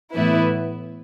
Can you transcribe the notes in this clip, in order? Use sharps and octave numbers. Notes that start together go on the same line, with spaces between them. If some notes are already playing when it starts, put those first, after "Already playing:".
A2 E3 B3 E4 B4